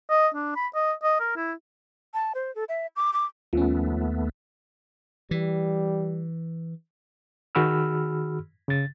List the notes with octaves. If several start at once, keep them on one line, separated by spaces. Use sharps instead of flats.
D#5
D4
B5
D#5
D#5
A#4
E4
A5
C5
A4
E5
D6
D6
D#2 F3 A3 B3 C#4
E3 G3
D#3 F#4 G#4 B5 E6 F6
C#3 A6